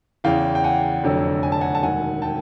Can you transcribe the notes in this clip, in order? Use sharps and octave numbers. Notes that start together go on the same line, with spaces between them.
E2 C#3 E3 F5 G5
G5
F#5 G#5
F1 F2 D3 F#3
G#5
A5
F#5 G#5
A5
E1 D#2 D#3 F#5 G#5
G5 A5